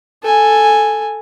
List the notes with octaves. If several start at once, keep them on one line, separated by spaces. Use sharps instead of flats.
A4 G#5